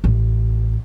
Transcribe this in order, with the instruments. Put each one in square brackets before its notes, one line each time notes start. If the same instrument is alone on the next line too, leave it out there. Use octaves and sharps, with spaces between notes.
[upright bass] A1